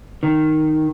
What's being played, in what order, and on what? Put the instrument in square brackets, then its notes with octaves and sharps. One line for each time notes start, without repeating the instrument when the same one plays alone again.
[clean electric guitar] D#3